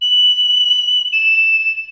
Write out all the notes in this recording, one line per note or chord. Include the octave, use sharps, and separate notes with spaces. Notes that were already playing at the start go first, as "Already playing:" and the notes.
F#7
E7